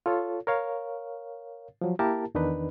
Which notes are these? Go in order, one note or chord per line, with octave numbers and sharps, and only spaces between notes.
F4 A4 C#5
A#4 C#5 F5
F3 F#3
A#3 E4 G4 A#4 A5
E2 D#3 D4 D#4 B4